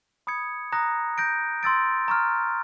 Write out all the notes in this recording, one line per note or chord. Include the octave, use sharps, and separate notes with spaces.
B5 D#6 G#6 C#7
A#5 D#6 F#6 A#6
G6 A#6 D7
C6 E6 A6 D7
A#5 C#6 F6